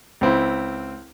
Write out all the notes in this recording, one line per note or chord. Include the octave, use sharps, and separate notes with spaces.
C#2 C4 E4